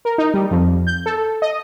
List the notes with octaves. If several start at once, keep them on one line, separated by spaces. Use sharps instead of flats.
A#4
D#4
G3
F2
G6
A4
D#5